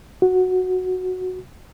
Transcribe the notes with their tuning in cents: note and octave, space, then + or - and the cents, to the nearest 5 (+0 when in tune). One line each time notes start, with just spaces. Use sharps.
F#4 -5